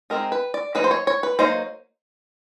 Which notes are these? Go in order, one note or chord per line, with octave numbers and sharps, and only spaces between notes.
G#3 C4 D#4 A#4
B4
D5
F#3 A#3 D#4 B4
C5
C#5
C#5
B4
F#3 A#3 D#4 C5